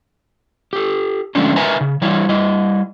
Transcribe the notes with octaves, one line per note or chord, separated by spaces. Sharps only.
G4 A4
D3 F3 G#3 A3 C#4 D4
D#4 A#4 B4 E5 G#5 A#5
C#3
E3 G3 E4 C#5 D5
G3 E4 D#5